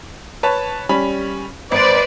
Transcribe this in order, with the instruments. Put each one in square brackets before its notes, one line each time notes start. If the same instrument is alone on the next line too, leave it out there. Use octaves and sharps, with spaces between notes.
[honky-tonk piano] B4 C#5 A5
G3 C#4 B5
[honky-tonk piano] G#1 D7 [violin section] B4 C5 D5